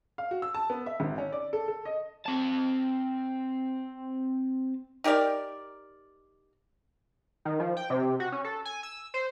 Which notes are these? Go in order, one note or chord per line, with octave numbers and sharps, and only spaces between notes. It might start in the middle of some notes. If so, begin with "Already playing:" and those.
F5
F#4
E6
A5
B3
E5
G#1
C#4
D5
A4
A4
D#5
C4 A5
D#4 G4 A#4 D5
D#3
F3
G5
C3
F#4
C#4
A4
G#5
E6
C5